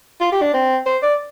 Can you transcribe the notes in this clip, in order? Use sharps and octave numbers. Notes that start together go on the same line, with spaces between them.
F4
G4
D4
C4
C5
D5